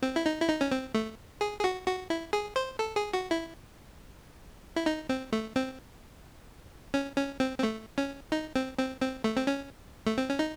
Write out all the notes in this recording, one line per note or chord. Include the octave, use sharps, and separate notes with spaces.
C4
E4
D#4
E4
D#4
C#4
C4
A3
G#4
G#4
F#4
F#4
E4
G#4
C5
A4
G#4
F#4
E4
E4
D#4
C4
A3
C4
C#4
C#4
C4
C4
A3
C#4
D#4
C4
C4
C4
A3
C4
C#4
A3
C4
C#4
D#4